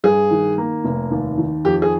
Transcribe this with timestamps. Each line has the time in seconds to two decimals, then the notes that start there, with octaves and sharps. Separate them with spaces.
0.04 G2 G#4
0.31 D#3
0.58 A#3
0.85 F1
1.11 D#2
1.38 D#3
1.65 F2 G4
1.82 G#4